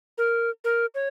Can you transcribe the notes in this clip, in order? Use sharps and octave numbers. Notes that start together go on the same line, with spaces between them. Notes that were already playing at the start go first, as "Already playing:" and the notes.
A#4
A#4
C#5